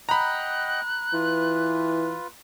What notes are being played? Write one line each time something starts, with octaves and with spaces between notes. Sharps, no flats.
D#5 F#5 G5 A#5 B5 F#6
E3 F4 B4